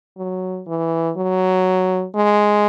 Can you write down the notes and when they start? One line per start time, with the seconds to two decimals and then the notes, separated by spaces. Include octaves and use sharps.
0.18 F#3
0.67 E3
1.17 F#3
2.15 G#3